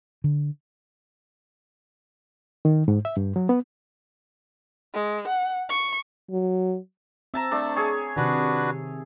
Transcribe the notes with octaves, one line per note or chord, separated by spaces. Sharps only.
D3
D#3
G#2
E5
G2
F#3
B3
G#3
F#5
C#6
F#3
C4 E5 A5 A#5
A3 D4
G#4 C#5
C3 D#3 D4 F#4 B4